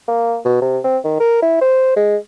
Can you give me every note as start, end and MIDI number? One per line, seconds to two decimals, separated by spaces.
0.08 0.38 58
0.45 0.61 47
0.62 0.79 48
0.84 0.98 60
1.04 1.17 51
1.20 1.40 70
1.42 1.59 64
1.61 1.93 72
1.96 2.17 56